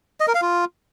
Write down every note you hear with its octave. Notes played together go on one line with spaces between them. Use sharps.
D#5
A#4
F5
F4